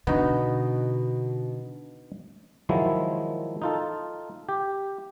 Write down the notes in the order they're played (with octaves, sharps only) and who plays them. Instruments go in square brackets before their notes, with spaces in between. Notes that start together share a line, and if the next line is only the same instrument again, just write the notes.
[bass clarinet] B2 [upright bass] D3 [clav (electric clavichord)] B3 D#4 F#4
[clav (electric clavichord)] D#3 F3 F#3 G#3 E4
D#4 F4 A4
G4